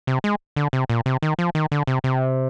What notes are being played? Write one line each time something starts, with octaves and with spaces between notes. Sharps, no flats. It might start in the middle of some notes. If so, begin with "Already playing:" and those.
C3
G#3
D3
C3
A#2
C3
D#3
F3
D#3
D3
C3
C3